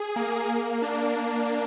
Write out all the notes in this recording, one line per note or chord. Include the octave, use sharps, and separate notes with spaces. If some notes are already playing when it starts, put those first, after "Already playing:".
Already playing: G#4
A#3
D4